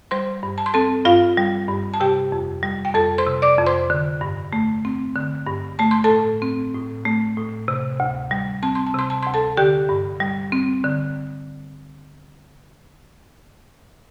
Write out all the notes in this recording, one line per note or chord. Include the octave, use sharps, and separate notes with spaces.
G3 C5 C6
G2
A5
C6
C4 A4 A5
G2 F4 F5
G3
G2
A5
C3 G4 G5
F2
G3
G5
F2 A4 A5
C5 C6
C3
D5 D6
F2
C5 C6
D3
G2
A3
C4
D3
G2
A3 A5
C6
A4 A5
A2
C4
A2
A3
A2
C3
D2
G3
C4 A5
C6
A5
C3 C6
A5
D2 C6
A4 A5
D3 G4 G5
G2
G3
C4
D3